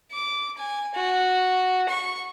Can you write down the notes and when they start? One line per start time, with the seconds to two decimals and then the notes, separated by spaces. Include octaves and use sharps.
0.12 D6
0.58 G#5
0.95 F#4
1.89 C#6